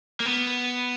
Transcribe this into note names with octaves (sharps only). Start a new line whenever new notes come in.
A#3
B3